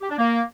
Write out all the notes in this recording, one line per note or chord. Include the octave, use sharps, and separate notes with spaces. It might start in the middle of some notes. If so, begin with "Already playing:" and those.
G4
D4
A#3